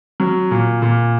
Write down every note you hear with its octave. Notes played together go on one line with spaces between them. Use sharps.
F#3
A#2
A#2